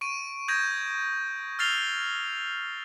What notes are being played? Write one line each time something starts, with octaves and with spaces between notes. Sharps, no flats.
C#6 D7 D#7
D#6 G6 G#6 A#6 D#7
E6 F6 A6 C7 F7 G7